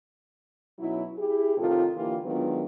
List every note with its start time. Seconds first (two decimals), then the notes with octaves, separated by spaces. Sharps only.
0.79 B2 F#3 C#4 D#4 E4
1.17 E4 G4 G#4
1.58 A2 C3 D#3 F4 A4
1.96 D3 E3 A#3 E4 F4 G4
2.24 D#3 F#3 G#3 B3 D4 F4